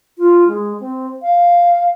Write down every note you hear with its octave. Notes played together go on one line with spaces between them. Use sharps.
F4
G#3
C4
F5